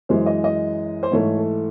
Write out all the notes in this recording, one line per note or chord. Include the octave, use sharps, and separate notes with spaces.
F#2 E3 G#3 C5
D#5
D#5
C5
G#2 E3 A3 C#5
A4